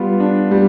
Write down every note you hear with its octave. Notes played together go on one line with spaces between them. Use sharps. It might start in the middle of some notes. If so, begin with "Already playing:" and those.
Already playing: G3 B3 F4
D4
G3